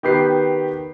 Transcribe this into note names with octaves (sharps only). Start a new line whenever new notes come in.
D#3 B3 G4 B4 C7